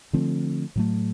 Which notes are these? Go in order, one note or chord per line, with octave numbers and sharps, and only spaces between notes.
D3 F3 A3 C4
A2 F#3 A3